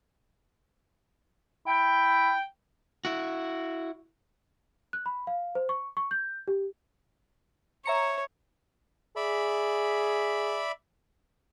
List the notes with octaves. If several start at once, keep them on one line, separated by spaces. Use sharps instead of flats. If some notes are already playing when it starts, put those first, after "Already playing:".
E4 G5
E4 F#4
F#6
B5
F5
C5
C#6
C#6
G6
G4
C#5 E5 A#5 C#7
G#4 D5 E5 B5